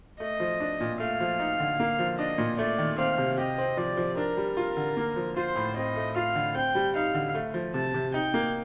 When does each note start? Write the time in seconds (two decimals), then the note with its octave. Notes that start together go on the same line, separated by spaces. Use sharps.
0.20 A3 D#5
0.40 F3
0.60 D4
0.81 A#2
1.00 A3 F5
1.20 F3
1.40 D#4
1.60 D3
1.80 A#3
1.99 F3
2.18 D4 D#5
2.38 A#2
2.59 A3 D5
2.78 D#3
2.98 C4 F5
3.18 C3
3.38 G4 D#5
3.58 C4
3.77 F3 D5
3.97 F3
4.17 D4 A#4
4.37 G3
4.57 F4 A#4
4.77 D3
4.97 A#3
5.16 F3
5.36 F4 C5
5.56 A2
5.76 C4 D#5
5.96 A3
6.16 F4 F5
6.35 D3
6.55 C4 G5
6.75 G3
6.95 D#4 F5
7.14 D3
7.35 A3
7.54 F3
7.74 C3 A5
7.94 C3
8.14 D#4 G5
8.34 A#3